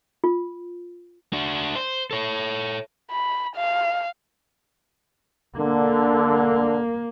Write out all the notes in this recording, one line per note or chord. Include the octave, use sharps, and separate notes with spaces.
F4
D4 F#4
C5
A4 C#5
B5
F5
D3 A#3